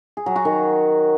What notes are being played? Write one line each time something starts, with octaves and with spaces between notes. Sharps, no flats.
G#4
F#3
F#4
D#3